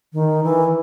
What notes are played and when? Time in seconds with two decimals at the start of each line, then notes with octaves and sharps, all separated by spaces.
0.13 D#3
0.44 E3